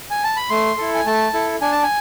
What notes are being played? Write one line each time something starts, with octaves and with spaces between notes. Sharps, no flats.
G#5
A5
B5
A3 C6
E4 A4
G#5
A3 A5
E4 A4
D4 G#5
A5
G#5